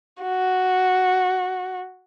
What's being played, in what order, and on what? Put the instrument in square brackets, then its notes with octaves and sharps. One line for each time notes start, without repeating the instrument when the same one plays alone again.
[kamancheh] F#4